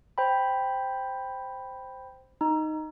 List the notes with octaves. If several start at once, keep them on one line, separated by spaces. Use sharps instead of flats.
C5 G5 B5
D#4